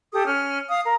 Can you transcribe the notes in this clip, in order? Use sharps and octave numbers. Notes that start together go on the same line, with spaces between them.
G4 A4 D#6
C#4 F6
F5 D#6
A#4